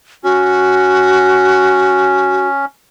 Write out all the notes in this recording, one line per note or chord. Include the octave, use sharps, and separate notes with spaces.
C#4 F#4